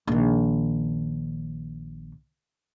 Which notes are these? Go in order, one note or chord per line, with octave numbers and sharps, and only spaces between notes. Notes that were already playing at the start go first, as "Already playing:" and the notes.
A#1 D#3